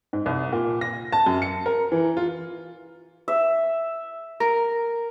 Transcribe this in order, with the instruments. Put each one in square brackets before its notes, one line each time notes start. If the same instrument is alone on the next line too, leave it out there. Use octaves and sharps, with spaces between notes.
[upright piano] G#2
C2
A#2
A#6
A5
F#2
C#7
A#4
E3
F4
[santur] E5
[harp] A#4